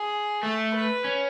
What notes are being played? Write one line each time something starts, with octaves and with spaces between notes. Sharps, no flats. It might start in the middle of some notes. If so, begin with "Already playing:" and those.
Already playing: G#4
A3 A4
B4
C#4